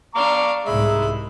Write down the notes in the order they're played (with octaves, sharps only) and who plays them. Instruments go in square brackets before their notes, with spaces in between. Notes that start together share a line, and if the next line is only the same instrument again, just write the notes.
[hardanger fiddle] D4 F5 [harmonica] A#5 C#6 D6
[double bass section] C2 G#2 [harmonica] G#3 E5 [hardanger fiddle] B5